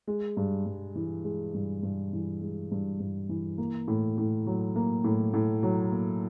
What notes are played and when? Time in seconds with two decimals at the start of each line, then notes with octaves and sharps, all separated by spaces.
0.08 G#3
0.37 G2
0.66 G2
0.96 E3
1.24 G#3
1.54 G2
1.83 G2
2.13 E3
2.41 G#3
2.71 G2
3.00 G2
3.29 E3
3.58 A#3
3.88 A2
4.18 A2
4.47 F#3
4.76 A#3
5.04 A2
5.34 A2
5.63 F#3
5.92 A#3